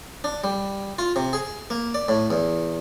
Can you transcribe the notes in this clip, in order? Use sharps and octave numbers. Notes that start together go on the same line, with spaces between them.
D4
G3
F4
C3
G#4
A#3
D5
A2
E2